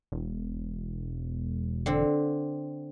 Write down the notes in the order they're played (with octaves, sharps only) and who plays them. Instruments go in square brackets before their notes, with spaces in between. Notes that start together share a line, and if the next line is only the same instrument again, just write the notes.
[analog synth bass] E1
[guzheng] D3 C4